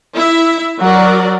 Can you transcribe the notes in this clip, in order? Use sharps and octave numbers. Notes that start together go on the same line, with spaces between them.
E4 E5
F#3 F#4 A#4 D5